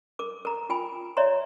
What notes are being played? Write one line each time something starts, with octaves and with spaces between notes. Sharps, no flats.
A#4 D6
A#4 A#5
F4 G5 G#5 B5
C#5 D5 E5 A#5 C6